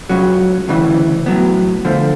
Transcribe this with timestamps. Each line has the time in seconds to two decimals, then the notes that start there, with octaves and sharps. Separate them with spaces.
0.09 C#2 C#3 F#3
0.68 D2 C#3 E3
1.26 A2 F#3 B3
1.85 D3 F3 A3